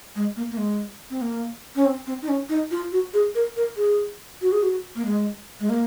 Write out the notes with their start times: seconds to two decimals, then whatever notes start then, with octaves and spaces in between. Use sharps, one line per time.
0.16 G#3
0.36 A#3
0.51 A#3
0.57 G#3
1.11 C4
1.22 A#3
1.76 C#4
1.86 C4
2.07 C4
2.22 D#4
2.29 C#4
2.49 D#4
2.71 F4
2.92 F#4
3.14 G#4
3.35 A#4
3.56 A#4
3.77 G#4
4.42 F#4
4.52 G#4
4.63 F#4
4.95 A#3
5.05 G#3
5.60 G#3
5.69 A#3